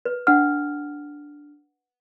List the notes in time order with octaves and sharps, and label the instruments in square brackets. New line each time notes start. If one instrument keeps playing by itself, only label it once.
[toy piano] B4
[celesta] D4 F6 [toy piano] F#5